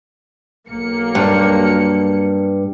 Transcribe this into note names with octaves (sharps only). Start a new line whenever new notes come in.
B1 A#3 C#7
G2